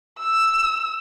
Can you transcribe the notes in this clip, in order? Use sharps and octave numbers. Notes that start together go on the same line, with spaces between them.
E6